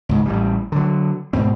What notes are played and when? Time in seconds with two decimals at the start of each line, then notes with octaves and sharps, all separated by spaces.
0.09 C#2 G#2 C#3
0.26 A1 A2 G3
0.72 D3 F#3
1.33 G#2 B2 C4